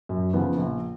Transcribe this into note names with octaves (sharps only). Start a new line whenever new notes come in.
F#2
C#3 F3 B3
A#1